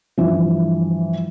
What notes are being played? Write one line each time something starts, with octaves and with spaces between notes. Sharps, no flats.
G2 E3 F3